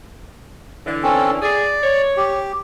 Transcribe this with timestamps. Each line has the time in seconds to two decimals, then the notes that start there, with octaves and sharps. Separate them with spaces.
0.86 D3 E3
1.03 C4 C#4 A4
1.42 G#4 D5
1.84 C#5
2.17 G4